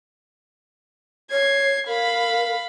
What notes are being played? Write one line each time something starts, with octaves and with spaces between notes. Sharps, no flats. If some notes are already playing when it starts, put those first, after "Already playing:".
C#5 G#6 C7
A#4 F5 B5